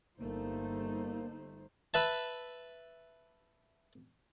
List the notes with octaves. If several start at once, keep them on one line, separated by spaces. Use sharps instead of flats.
G1 A3 A#3 D#4 C5
B4 E5 A5